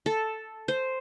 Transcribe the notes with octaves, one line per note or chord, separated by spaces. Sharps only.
A4
C5